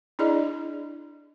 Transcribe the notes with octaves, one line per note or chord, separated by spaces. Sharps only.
D4 E4 G#4 D5 D#5